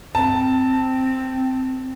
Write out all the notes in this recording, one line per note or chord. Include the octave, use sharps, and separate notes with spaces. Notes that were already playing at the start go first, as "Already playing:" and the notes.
C4 A5